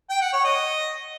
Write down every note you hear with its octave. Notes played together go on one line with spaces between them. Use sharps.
G5
F#5
C#5
D#5